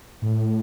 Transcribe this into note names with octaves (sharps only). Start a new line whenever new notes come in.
A2